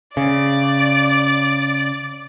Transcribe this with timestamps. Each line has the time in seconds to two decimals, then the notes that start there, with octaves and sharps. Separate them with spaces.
0.17 C#3 D5 D6